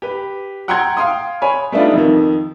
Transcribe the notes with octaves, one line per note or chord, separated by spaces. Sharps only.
G4 B4
F#5 G5 A#5 C6 G6 G#6
F5 G5 C6 D#6
C#5 G#5 B5
G3 A3 B3 D4 D#4 F4
F2 D#3